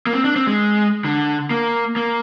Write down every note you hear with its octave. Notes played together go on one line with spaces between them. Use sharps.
A#3
C4
D4
C4
G#3
D3
A#3
A#3